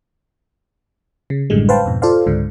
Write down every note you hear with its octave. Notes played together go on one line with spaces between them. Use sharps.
C#3
A1 F#2 A2 D3 G3 G#3
B4 C5 F5 G5 A5
F2 G#2 B2
F4 A4 C5 D5 F5
C#2 G#2 D3